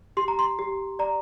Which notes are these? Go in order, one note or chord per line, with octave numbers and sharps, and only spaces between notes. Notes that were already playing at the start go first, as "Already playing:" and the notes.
G4 C6
A#5
C6
G4
D5 A#5